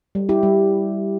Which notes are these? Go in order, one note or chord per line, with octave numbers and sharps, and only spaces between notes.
G3
E4 G4
G3